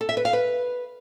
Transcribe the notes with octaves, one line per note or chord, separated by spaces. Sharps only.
A4
E5
B4
F5
B4